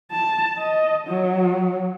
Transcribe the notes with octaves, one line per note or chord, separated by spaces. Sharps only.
A5
D#5
F#3